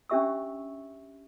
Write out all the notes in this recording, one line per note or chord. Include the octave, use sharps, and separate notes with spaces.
C#4 D4 G4 E5 C#6 E6